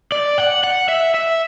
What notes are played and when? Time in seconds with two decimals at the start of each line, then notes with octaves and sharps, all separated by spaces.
0.12 D5
0.38 F#5
0.64 F#5
0.89 E5
1.14 E5